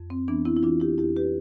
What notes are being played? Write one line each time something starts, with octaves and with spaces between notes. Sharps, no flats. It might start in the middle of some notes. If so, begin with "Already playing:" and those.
Already playing: F2
C4
E3 B3 D4
C4 E4
E4
E3 D4 F4
E4 G4
F2 E4 G4
G4 B4